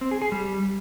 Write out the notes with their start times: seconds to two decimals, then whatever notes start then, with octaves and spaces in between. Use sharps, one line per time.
0.01 C4
0.11 G#4
0.22 G#4
0.32 G3